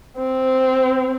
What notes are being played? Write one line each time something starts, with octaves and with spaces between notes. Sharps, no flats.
C4